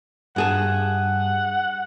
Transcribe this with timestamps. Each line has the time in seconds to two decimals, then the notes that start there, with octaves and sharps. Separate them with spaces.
0.36 G2 G#4 F#5 A5